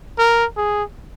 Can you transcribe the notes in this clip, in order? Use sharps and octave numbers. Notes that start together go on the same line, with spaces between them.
A#4
G#4